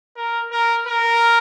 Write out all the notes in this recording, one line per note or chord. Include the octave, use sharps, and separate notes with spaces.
A#4
A#4
A#4